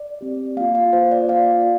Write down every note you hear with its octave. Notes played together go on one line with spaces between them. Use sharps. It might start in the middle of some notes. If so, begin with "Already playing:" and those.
Already playing: D5
C4 G4
A#3 F4 F5
F5
A#3 F4 C5
D5
A#3 F4 F5